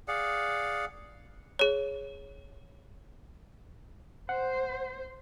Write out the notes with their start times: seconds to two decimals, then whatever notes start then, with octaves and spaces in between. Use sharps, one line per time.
0.08 G#4 D5 F5 F#5
1.59 G#4 C#5
4.29 C5 F#5